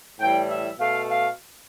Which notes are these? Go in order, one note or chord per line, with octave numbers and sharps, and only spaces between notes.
A2 E3 G3 G5
E5
B2 A3 F5
F5